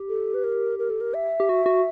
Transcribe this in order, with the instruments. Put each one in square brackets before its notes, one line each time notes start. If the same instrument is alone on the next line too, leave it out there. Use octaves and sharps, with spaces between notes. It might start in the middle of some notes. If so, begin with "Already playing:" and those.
Already playing: [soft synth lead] G4
[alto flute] A4
B4
A#4
A#4
A4
A#4
E5
[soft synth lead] G4
F#4
F#4